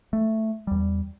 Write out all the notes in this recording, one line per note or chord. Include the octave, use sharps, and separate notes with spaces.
A3
E2 G3